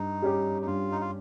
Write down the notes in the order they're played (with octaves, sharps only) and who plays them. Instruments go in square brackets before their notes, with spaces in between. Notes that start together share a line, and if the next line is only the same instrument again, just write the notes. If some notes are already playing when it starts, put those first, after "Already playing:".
Already playing: [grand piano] G2 [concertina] D#4
[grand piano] G3 C#4 G4
[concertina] D#4
[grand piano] G2 [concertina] F4
[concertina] D#4
F4